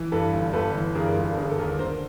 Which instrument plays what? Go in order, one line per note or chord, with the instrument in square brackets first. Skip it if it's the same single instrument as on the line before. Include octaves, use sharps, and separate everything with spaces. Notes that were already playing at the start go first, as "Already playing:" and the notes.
Already playing: [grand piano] E3
G2 A4 B4
G1
G1 A4 B4
E3
G2 G#4 A#4
G1
A4
D3 G#4 A#4
A4
D#2 G#4 A#4
D3 A#4 C5